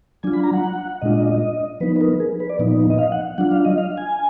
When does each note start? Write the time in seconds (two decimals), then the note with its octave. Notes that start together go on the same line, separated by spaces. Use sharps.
0.23 F#3 D4 F4 G#5
0.33 B5
0.43 A#5
0.53 F#5
1.02 A#2 G#3 D4 F4 D#5
1.80 F3 B3 D#4 B4
1.96 B4
2.01 A#4
2.20 G#4
2.40 B4
2.49 D5
2.59 A#2 F3 B3 D#4
2.90 D#5
2.99 F5
3.12 F#5
3.38 F#3 D4 F4 F#5
3.51 F5
3.65 D#5
3.78 F5
3.98 G#5